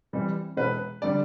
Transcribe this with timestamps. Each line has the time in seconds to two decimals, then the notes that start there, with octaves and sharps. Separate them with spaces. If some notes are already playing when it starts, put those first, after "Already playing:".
0.13 E3 G3 C4
0.57 E1 B4
1.02 D3 G3 D5